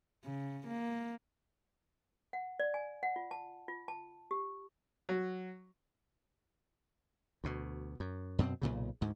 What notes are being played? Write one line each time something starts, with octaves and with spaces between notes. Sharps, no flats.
C#3
A#3
F#5
D5
G#5
F#5
F4
A5
F4
A5
G4
F#3
D2 B2
F#2
F#2 B2 B3 C4
B1 F#2 A#2 C#3
D2 G#2